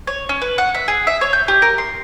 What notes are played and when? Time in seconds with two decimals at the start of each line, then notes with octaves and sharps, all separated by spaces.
0.07 C#5
0.29 C#4
0.42 B4
0.58 F#5
0.75 E5
0.88 G#4
1.07 E5
1.21 C#5
1.33 G6
1.48 G4
1.62 A#4
1.78 C6